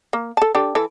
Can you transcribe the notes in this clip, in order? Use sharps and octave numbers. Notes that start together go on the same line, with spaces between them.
A#3
A4 A5
D4 G4 A4
E3 A4